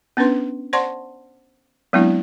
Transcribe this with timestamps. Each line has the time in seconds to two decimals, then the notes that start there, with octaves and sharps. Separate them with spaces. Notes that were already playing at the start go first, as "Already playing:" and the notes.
0.17 B3 C#4 D4 B4 C6
0.73 C5 D5 F#5 A5 C6 C#6
1.93 F#3 G#3 B3 C4 D4 E4